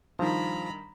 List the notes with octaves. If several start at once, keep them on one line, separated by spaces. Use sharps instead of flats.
G2 D#3 F3 A#5 B5